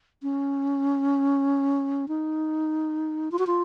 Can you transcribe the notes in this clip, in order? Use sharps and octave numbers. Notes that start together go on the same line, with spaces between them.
C#4
D#4
F4
F#4
F4